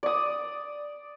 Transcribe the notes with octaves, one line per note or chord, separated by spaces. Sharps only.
D5 D#6